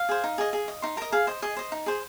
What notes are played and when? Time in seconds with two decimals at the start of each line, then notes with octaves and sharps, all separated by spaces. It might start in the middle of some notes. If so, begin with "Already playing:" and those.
Already playing: F5
0.09 G#4 C5
0.24 D#4
0.38 G#4 D#5
0.53 G#4
0.68 D#5
0.82 D#4 C6
0.97 A#4 D#5 A#5
1.12 G#4 F5
1.27 C5 D#5
1.42 G#4 D#5
1.56 C5 D#5
1.72 D#4
1.86 G#4 C5